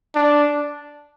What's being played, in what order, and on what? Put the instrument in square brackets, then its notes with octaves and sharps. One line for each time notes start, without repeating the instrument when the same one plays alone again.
[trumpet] D4